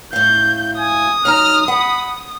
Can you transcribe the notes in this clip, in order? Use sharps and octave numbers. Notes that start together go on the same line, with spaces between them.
A2 F5 G6
G#5 D#6
F#3 D#4 A#5 F6
F#5 B5